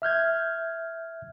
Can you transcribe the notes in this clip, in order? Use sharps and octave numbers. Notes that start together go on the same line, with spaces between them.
E5 F6 G6 G#6